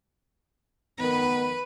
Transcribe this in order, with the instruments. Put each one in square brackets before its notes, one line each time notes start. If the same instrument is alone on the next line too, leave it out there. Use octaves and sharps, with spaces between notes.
[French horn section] D#3 B3 [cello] B4